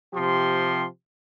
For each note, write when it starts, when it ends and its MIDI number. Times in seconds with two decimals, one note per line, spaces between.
0.14 0.86 48
0.14 0.86 53
0.14 0.86 67
0.14 0.86 84